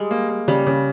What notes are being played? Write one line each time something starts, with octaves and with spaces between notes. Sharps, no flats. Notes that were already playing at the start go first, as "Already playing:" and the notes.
Already playing: G3 G#3
A#3
A#3
C#3 G3
C#3